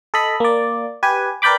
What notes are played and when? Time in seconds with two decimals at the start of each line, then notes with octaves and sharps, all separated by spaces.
0.14 A4 D#5 B5
0.40 A#3 D5
1.03 G4 B4 G#5
1.42 A#4 B4 D5 G5 B5 D6